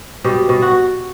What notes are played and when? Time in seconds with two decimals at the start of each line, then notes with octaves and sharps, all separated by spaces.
0.24 B2 G4
0.49 B2
0.62 F#4